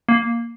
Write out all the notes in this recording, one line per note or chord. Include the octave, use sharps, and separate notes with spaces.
A#3